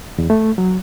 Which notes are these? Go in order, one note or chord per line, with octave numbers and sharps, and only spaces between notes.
E2
A3
F#3